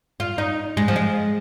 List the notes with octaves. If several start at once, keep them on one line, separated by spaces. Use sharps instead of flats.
F4
D#4
G#3
F3
G#3